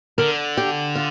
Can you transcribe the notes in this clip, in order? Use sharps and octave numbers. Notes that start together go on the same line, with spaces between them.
D3 A#4
G4
F4